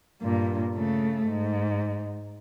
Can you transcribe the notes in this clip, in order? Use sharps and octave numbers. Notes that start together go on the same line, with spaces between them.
G2 A#2
C#3 A3
G#2